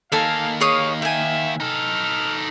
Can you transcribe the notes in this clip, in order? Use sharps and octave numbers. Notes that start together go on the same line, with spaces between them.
D#2 A#3 A4 F5 G#5
G#4 C#5 F5 D#6
E5 G5 G#5
D#4 A4 F6